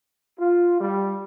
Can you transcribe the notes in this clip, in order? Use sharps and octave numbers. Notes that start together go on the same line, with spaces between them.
F4
G3